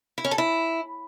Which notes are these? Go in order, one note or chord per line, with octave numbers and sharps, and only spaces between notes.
E4
C#4
A4
E4